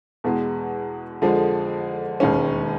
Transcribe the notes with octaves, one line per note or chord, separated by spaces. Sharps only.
E2 B2 G#3
F2 D3 F3 G#3
E1 D#2 D#3 G#3 C#4